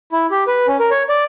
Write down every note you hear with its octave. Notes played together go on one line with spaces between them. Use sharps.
E4
G4
B4
C#4
A#4
C#5
D5